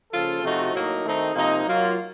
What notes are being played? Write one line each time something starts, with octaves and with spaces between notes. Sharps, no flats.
C#3 F3 A#3 F4 A4
C3 F3 A3 D#4 F#4
A2 F#3 A#3 D#4
D#3 A3 C4 D#4
C3 F3 A#3 D#4
F#3 A#3 F4